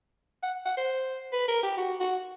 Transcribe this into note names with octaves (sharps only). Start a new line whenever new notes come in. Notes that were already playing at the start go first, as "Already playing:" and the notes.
F#5
F#5
C5
B4
A#4
G4
F#4
F#4